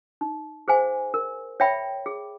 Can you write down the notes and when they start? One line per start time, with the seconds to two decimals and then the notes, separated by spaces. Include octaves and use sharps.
0.21 D#4
0.68 G#4 C5 F5 G#5
1.14 A#4
1.60 C#5 E5 G5 B5
2.06 G#4